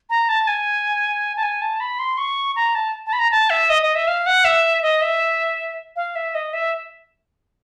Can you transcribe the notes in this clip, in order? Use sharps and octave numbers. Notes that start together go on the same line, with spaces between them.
A#5
A5
G#5
A5
G#5
A5
B5
C6
C#6
A#5
A5
A5
B5
A#5
A5
E5
D#5
D#5
E5
F5
F#5
E5
D#5
E5
F5
E5
D#5
E5